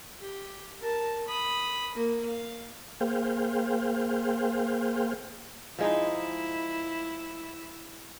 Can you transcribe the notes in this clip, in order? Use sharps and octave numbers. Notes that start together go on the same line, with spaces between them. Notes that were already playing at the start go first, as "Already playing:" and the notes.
G4
A#4 A5
B5 D#6
A#3
F5
A#3 G#4 C5 F5 G5
F3 G#3 D#4 E4